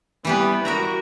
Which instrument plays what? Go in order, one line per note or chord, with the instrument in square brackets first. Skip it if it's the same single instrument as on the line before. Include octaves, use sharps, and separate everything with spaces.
[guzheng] E3 G4 B4 [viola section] G3 B3
[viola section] F#4 [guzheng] A#4 E5 A#5